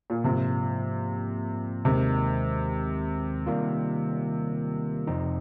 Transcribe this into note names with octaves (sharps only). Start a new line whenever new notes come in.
A#2
G#2 C3 F3 A#3 F4
D#2 C3 D#3 G#3
D#3 G3 A#3 F4
F2 C3 F3 C4 D#4